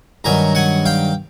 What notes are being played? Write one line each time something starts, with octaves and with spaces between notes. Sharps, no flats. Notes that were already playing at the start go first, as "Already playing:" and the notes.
G2 D#3 F#3 G#5 A#5
F#5 G#5
F5 G5